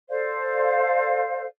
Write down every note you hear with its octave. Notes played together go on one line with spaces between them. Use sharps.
A4 C5 D5 F5